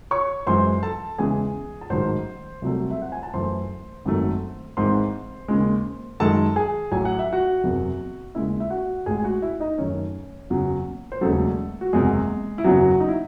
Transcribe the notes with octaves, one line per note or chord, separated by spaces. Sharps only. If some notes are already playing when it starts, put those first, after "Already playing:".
C#5 C#6
F#2 E3 G#3 C5 C6
A4 A5
E2 C#3 E3 G#3 G#4 G#5
A5
A1 G#2 D#3 F#3 C5 C6
C2 C3 F#3 A3
E5
F#5
G#5
A5
F#2 E3 A3 C5 C6
G#1 F#2 D#3 F#3 A3
G#1 G#2 E3 C5 C6
D#2 C#3 G#3
F#2 D#3 G#3 A4 A5
G#4 G#5
A1 A2 F#3 G#5
F#5
E5
F#4 F#5
F#1 E2 C3
D#2 C#3 G#3 E4 E5
E5
F#4 F#5
A1 A2 G#3 G#4 G#5
G#5
F#4 F#5
E4 E5
D#4 D#5
F#2 D#3 A3 C#4 C#5
F#1 E2 C#3 F#3
C5
E1 D#2 C#3 F#3 A3 A4
F#4
F#1 E2 C3 G#3 G#4
E4
F#1 E2 C#3 E3 F#3 F#4
D#4
E4